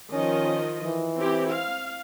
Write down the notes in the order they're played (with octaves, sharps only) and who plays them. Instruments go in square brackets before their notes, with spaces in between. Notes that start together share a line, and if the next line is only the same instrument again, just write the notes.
[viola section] D#3 F3 D#5 [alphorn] C#4
[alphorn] E3
[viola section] C4 E4 G4
F5